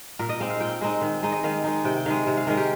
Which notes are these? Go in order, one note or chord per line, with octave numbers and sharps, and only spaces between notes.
A#2 A#4
D#5
G#3 C4 D#4 F5
F5
A#2 G5
G#3 C4 D#4
D#3
G#3 D#4
D#5
D#3 F5
G#3 D#4
C3 G5
G5
D#3 G#3 F5
C3
F5
D#3 G#3 A#4
G4